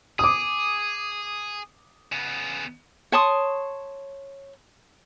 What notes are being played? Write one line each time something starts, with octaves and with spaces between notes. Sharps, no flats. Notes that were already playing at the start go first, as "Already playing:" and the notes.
G#4 D6 D#6
C#3 B3
C#5 A5 C6 D#6